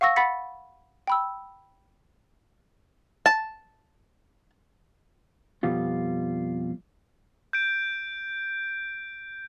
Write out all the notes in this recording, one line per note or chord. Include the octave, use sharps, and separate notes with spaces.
F5 F#5 C#6 E6 A#6
F#5 B5 A6 B6 C#7
G5 B5 E6
A5
F2 B2 G3 F4
G6 D7